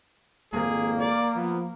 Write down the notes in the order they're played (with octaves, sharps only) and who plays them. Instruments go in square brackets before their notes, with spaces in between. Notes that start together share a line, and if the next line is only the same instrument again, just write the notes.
[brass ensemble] G#1 F2 [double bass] A#3 [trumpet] G#4
[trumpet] D5
[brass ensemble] F3 F4 [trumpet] B3